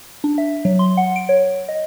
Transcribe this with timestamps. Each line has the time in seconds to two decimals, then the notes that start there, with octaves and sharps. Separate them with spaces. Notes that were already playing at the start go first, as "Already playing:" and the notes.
0.24 D4
0.38 E5
0.65 F#3
0.79 C6
0.97 F#5
1.16 D7
1.29 C#5
1.69 D#5